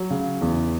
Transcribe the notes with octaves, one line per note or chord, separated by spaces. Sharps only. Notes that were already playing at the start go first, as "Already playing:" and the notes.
Already playing: F#3
C#3
E2